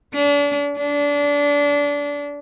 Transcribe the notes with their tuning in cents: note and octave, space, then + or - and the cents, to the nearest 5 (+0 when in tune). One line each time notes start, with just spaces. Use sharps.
D4 -35
D4 -25